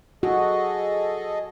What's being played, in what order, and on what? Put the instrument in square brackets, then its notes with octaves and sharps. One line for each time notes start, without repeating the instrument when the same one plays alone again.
[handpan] F#4 [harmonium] G#4 A4 D#5